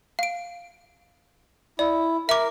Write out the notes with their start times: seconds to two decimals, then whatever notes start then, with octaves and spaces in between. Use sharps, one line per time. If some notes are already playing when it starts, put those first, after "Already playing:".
0.19 F5 D7
1.79 E4 D5
2.29 A#4 E5 D6